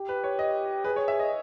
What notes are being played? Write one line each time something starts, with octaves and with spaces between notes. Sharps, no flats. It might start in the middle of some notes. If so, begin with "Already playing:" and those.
Already playing: G4
B4
C#5
D#5
G#4 B4
C#5
E5
D#5